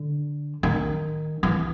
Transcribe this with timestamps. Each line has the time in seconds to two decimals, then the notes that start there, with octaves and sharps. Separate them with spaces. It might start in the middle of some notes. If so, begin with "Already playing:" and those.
Already playing: D3
0.63 D#3
1.43 E3